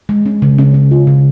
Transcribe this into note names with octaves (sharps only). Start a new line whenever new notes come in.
G#3
C#4
C#3
C#4
C#4
F4
C#3